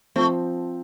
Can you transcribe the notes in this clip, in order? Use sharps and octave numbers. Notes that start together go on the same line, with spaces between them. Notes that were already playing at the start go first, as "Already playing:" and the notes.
F3 A3 C4